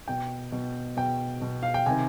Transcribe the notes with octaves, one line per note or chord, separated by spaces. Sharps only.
B2 G5
B2
B2 G5
B2
F5
G5
C3 D#3 G#5